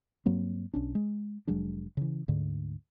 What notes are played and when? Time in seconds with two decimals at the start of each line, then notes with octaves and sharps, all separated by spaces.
0.26 G2 F#3 A#3 C4
0.74 B1 C#4 D4
0.95 G#3
1.47 F1 F#3 G#3 D4
1.97 C#3 E3
2.28 D2 G#2 D3